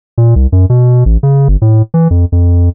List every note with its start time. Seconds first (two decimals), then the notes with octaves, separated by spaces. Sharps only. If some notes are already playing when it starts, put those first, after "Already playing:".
0.18 A#2
0.36 C2
0.52 F#2
0.70 B2
1.06 A1
1.23 C#3
1.48 G1
1.62 A2
1.94 E3
2.11 F2
2.32 F2